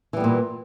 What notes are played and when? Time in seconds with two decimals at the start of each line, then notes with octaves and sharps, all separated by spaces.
0.13 E3
0.17 G3
0.20 B3
0.24 A#2